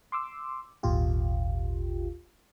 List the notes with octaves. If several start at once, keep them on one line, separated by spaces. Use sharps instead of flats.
C6 D6 E6
G#1 D#2 A#2 F4 G4